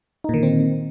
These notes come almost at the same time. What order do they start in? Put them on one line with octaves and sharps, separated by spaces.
D#4 A#2 D#3 D3 C4